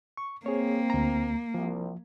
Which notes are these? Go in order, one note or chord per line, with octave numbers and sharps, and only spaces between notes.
C#6
A#3 C4 G#4 C#5
D2 A#5
C2 F3